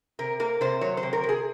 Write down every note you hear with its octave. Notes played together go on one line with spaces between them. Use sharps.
C3 A#4
A#3 A#4
C3 C5
F#3 C#5
C5
C3
A#4
C3
G#4